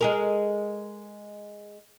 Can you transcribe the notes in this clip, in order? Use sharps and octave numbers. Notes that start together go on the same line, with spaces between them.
G#3 G#4 A#4